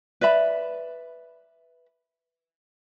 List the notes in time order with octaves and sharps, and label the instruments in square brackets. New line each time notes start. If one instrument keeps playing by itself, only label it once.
[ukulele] B4 D5 E5 B5